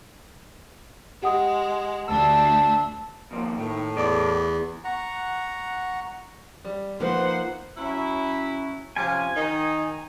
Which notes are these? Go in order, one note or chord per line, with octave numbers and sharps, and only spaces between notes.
G#3 G4 F#5 D#6
D2 D4 A5 E6
D#2 F3 A#3
A2 D#3
E2 D5
F#5 A#5 C#6
G3
F3 A#3 C4 D#4 B4 C5 F#5
F#3 C#4 E4
C3 F3 C#4 G#5
D#3 D#4